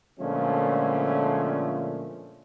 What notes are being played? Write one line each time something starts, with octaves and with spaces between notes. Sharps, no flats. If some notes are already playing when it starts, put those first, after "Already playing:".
A#2 D3 F3 G#3 A3 C#4